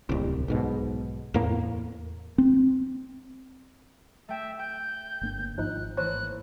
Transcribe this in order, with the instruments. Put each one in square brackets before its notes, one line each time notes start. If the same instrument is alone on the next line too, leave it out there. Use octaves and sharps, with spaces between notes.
[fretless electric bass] D1 C2
B1 G#2 B2
E2 A2 A#3
C4
[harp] A3 G5 [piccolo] E5
[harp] G5 [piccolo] G6
[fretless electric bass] G1 A#3 D4
[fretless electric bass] G#1 [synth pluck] F3 D#4 [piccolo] F#6
[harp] E3 A3 A#3 [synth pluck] C5 C#5 [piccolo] F#6